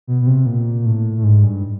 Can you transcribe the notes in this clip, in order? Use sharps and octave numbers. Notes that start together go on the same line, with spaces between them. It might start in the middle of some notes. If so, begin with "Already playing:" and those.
B2
B2
C3
A#2
A2
A2
G#2
G2